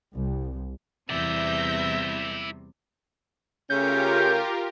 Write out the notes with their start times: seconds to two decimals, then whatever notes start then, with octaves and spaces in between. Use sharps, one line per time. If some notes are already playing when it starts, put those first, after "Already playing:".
0.14 C2
1.10 E2 C3 G3 E4 D5 E5 G6 A#6
3.70 C#3 A3 C#4 F4 G4 A#4 G6